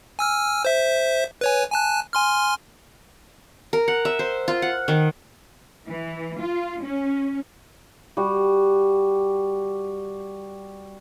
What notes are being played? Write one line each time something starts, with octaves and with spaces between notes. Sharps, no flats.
G#5 E6 F6
C5 E5
B4 C#5 G#5
G#5 A5 F#6
G#5 C6 F6
A#4
F#5
E5
C5
F4
F#5
D#3
E3
F4
C#4
G3 F#4